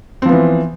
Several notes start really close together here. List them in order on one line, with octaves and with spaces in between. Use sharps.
C4 F3 B3 E3